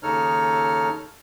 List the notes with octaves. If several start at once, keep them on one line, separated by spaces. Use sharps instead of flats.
D#2 C#3 D#4 A4 C#5 F6